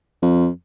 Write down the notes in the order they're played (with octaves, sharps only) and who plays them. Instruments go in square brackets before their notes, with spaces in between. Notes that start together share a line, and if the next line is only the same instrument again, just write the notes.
[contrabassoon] F2